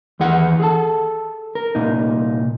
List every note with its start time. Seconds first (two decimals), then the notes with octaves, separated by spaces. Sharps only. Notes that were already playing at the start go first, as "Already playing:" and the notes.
0.20 D#2 E3 G#4 F#5
0.60 G#4 A4 A5
1.55 A#4
1.75 C2 A#2 D#4